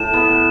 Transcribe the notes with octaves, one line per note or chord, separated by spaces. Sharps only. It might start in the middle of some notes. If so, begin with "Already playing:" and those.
Already playing: A2 E7
B3